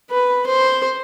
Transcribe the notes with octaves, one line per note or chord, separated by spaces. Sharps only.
B4
C5